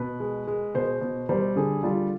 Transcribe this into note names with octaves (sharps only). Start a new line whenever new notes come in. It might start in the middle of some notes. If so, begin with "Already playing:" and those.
Already playing: B2 B4
G#3
G#3
B2 C5
B2
G3 C5
D3 G#4
G3 F4